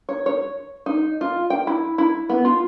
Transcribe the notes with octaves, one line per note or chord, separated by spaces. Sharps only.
C#5
C#5
D#4
F4
G5
E4
E4
B3
F4